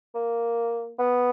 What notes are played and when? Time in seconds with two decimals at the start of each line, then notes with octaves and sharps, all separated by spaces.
0.15 A#3
0.99 B3